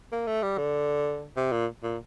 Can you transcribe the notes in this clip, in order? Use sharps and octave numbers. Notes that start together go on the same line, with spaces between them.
A#3
A3
G3
D3
C3
A#2
A#2